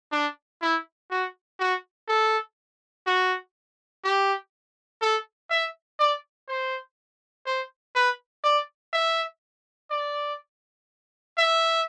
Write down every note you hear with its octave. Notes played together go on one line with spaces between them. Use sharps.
D4
E4
F#4
F#4
A4
F#4
G4
A4
E5
D5
C5
C5
B4
D5
E5
D5
E5